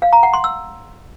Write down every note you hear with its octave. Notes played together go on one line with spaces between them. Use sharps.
F5
A#5
F#5
C6
E6